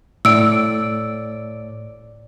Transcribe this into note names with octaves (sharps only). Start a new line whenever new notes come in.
A2 D5 E6 D7